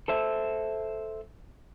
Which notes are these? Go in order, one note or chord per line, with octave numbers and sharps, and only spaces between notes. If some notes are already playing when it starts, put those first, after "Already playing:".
A4 C5 E5